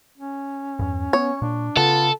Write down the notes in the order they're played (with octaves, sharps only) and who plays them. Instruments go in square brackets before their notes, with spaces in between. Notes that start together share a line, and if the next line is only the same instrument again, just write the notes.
[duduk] C#4
[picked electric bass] E2 G2
[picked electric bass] B3 [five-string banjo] C#5
[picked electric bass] A#2 [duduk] D4
[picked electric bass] C#3 [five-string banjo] B3 [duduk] F4 [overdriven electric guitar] A4